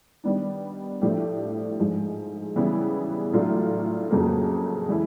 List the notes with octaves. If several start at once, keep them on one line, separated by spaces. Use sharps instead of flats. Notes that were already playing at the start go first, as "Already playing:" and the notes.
D#3 G3 B3 D4
A2 F3 A3 D4 G4
G#2 F3 G#3
C#3 E3 G3 B3 E4
A2 F#3 A3 D4 F4
F2 C#3 F#3 A#3
E3 G#3 E4